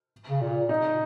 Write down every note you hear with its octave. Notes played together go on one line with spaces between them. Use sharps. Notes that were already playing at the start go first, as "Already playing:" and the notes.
C#3
A#2
D#4